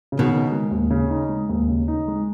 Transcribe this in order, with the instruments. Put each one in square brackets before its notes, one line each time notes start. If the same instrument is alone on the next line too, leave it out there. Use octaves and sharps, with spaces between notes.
[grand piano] C#3
[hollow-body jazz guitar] B2 D#3
[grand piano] D#4
G#3
D#2
C#3
D#4
G#3
D#2
C#3
D#4
G#3